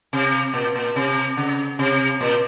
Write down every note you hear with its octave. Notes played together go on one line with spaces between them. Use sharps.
C3
A#2
A#2
C3
C#3
C3
A#2